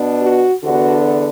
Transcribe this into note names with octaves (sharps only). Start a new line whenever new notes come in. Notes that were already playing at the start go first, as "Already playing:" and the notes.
Already playing: B2 B3 D4
F#4
E2 D3 B3 D4 F#4